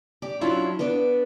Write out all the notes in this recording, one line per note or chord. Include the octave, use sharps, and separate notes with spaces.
G4 D5
F#3 C#4 D4 E4 F4
B3 D4 B4 D5